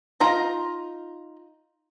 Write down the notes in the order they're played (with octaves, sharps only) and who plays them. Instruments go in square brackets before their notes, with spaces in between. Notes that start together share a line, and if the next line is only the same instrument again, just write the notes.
[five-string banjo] D#4 F4 A#5